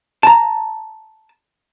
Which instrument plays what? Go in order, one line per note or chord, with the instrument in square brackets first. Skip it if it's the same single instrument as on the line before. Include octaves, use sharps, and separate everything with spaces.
[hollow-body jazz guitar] A5 A#5